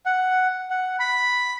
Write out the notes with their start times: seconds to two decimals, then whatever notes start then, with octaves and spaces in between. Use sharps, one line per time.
0.06 F#5
0.70 F#5
0.99 B5